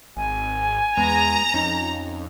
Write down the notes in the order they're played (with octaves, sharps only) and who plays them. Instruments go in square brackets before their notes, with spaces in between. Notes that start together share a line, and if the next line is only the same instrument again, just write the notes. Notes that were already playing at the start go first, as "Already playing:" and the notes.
[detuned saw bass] G#1 [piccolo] G#5
[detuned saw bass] E2 [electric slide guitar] G#3 B3 [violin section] A#5
[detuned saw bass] F2 [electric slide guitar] C#4 D#4